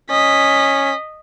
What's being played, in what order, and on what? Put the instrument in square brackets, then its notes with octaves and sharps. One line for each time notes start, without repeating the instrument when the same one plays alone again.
[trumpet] C#4 [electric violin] D#5 B6